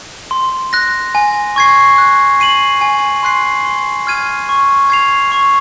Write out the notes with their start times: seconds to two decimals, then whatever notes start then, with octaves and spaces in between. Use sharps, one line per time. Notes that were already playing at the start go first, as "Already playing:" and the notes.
0.31 C6
0.73 F#6 A#6
1.15 G#5
1.56 C#6 G#6 C7
1.98 F#6
2.40 C7 D#7 F#7
2.81 G#5
3.23 C6 F#6 C7
3.65 C6
4.07 F6 G#6 D#7
4.49 C#6
4.90 G#6 C7 F7
5.32 C#6